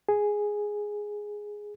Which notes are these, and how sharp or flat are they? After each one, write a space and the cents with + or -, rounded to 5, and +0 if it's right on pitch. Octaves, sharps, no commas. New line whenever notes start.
G#4 +0